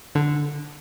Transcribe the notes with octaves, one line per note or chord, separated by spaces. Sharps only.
D3